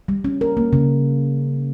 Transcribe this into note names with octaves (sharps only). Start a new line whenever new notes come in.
G3
C#4
A#4
A#3
C#3